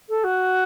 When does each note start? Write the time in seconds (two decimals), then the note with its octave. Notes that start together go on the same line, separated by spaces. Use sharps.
0.09 A4
0.24 F#4